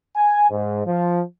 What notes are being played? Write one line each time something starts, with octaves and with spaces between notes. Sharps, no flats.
G#5
G#2
F3